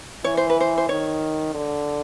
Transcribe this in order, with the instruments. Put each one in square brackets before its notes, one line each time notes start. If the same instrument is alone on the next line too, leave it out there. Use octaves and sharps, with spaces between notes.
[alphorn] E3 [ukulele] C#5
[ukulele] C5
B4
C5
C5
[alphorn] D#3 [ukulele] C#5
[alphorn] D3